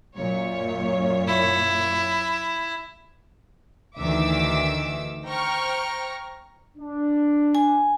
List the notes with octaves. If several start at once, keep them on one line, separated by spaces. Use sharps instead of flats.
F#2 A#2 C#5
E4
D2 D#3 E3 E5 D6 E6
C5 G5 A#5 C#6 F6
D4
G#5